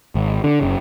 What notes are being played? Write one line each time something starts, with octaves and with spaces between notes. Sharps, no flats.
G#1
D3
F#1 C#3